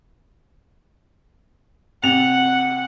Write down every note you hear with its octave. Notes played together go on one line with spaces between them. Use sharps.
C3 F#5 F7